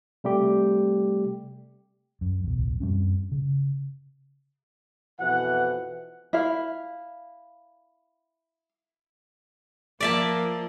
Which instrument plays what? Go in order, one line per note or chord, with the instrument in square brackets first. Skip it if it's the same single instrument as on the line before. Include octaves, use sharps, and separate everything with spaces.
[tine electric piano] C3 G3 A3 G4
[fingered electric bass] F#2
D1 B1 E2
F#2 G3 C4 C#4
C#3
[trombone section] F2 B2 E3 [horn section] F#5
[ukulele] E4 F5
[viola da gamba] F3 A#3 [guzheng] D5 E5 A5